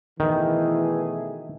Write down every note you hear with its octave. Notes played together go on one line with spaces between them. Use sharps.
B2 D#3 E3 A3 G#4